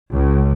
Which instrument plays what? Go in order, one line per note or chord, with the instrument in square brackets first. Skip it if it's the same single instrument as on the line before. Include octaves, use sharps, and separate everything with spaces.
[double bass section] C#2